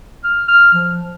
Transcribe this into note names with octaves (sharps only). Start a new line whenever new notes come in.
F6
F6
F3